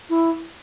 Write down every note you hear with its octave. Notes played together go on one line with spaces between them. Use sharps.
E4